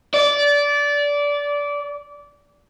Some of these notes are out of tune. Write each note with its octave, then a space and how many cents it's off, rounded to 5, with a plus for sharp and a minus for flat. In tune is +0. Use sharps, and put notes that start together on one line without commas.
D5 -20